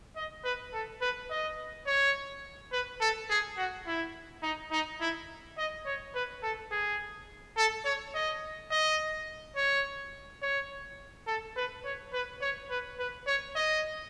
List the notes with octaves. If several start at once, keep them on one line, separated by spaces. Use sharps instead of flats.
D#5
B4
A4
B4
D#5
C#5
B4
A4
G#4
F#4
E4
D#4
D#4
E4
D#5
C#5
B4
A4
G#4
A4
C#5
D#5
D#5
C#5
C#5
A4
B4
C#5
B4
C#5
B4
B4
C#5
D#5